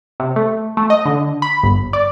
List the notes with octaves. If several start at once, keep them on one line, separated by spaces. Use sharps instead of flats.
C3
A3
A3
D#5
D3
B5
G1
D5